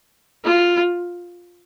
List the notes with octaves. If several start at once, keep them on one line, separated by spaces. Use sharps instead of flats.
F4